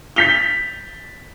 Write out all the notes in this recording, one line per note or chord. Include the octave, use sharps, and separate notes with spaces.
G6 A6 B6 F7 G7